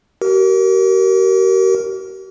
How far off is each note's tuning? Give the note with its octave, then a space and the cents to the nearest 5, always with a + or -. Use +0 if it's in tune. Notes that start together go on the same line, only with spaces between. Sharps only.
G4 -45 A#4 +0